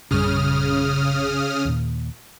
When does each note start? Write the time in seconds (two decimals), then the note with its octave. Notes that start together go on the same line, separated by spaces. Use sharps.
0.11 A#1 F#2 C#3 G3 D#6 F6
1.65 D#2 A#2